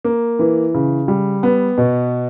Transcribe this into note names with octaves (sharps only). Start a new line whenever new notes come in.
A#3
E3
C#3
G3
B3
B2